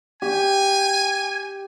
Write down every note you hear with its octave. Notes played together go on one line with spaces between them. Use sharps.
G4 G#5